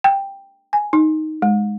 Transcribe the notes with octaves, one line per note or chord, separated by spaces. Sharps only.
G5
G#5
D#4
G#3